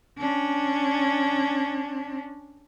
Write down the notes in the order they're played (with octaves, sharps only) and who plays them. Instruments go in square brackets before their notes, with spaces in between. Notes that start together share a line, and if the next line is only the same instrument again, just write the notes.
[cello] C#4 D4